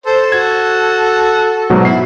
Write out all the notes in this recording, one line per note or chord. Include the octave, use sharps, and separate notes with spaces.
A4 C5
F#4 G#6
G#2 B2 F#3
E4 C7